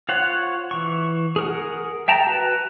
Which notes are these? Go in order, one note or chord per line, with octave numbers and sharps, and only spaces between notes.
F4 C5 C#5 F#5
E3 C#6
G#4 A#4 F#5
E5 G5 A5 A#5
F#4 B4